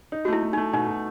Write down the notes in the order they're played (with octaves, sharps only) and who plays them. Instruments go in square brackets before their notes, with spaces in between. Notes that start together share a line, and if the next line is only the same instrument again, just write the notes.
[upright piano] D#4
[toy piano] F#4
[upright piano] A3 [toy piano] E4
[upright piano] A3
[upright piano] A3 [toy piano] D#4
[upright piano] B2 [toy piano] D#4
[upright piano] B2